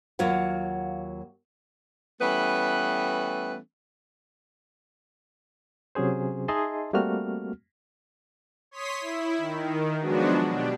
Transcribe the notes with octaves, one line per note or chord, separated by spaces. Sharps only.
D#2 F#3 A#3 F4 C#5 F#5
E3 G3 A3 B3 C#4 B4
C3 F#3 C#4 G#4 C5
D#4 G#4 D#5 E5 A5 C6
G3 A3 A#3 C4 F#4 F6
C#5 C6 D#6 B6
E4
D#3
F3 F#3 G#3 B3 D4 F#4
B2 D4 G4